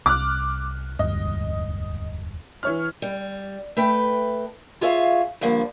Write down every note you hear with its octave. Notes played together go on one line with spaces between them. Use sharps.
C2 D6 F6 F#6
E1 D2 G2 D#5
E3 C#5 F6
G3
A3 B4 G5
F4 G#4 C#5 E5 F5
G2 D3 F3 A#3